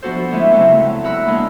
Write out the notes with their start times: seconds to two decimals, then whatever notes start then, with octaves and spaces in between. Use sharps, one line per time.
0.02 F3 B3 D4 F#4 A4 C5
0.31 D3 G#3 A3 E4 B4
0.52 C#3 F#3 A3 C4 A4
0.72 D3 A3
1.04 A#4 F#5 B5 E6 F#6
1.27 D3 G#3 A#3 B3 D4